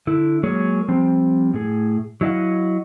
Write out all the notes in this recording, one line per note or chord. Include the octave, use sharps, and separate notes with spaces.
D3 E4
F#3 G#3 A#3 G#4 C#5
F3 G3 C4
A2 G#4
F#3 E4 D#5 F5 F#5